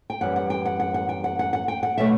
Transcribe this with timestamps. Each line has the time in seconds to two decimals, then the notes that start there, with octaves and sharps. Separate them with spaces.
0.10 G5
0.21 F#2 E3 G3 F#5
0.36 F#5
0.50 G5
0.65 F#5
0.80 F#5
0.94 F#5
1.09 G5
1.24 F#5
1.39 F#5
1.53 F#5
1.68 G5
1.83 F#5
1.98 B2 F#3 A3 E5